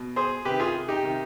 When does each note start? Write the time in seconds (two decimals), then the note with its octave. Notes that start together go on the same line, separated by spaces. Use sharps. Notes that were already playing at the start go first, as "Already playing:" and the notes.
Already playing: B2
0.16 G#4 C5
0.45 C3 D#3 G4 B4
0.60 F4 G#4
0.88 D#4 G4
1.03 C3 D#3